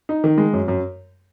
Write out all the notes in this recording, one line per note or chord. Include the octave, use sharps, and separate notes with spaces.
D#4
D#3
G#3
F#2
F#2